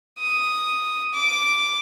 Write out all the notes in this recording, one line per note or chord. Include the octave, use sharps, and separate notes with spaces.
D#6
D6